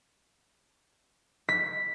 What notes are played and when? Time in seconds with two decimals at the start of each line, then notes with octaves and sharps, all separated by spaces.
1.49 B6